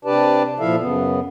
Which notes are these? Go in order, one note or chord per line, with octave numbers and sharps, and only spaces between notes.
C3 D4 G4 B4 D5 A5
A#2 F3 E4 A4 E5 F5
F#2 C#3 B3